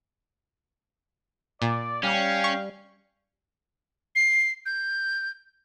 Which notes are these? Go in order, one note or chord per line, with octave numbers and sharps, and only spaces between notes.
A#2 D5
G3 C#4 F5 G5
C#6
C7
G6